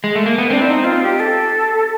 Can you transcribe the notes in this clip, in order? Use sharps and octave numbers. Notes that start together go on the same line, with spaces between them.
G#3
A3
A#3
B3
C4 D4
E4
D#4
F4
G4
A4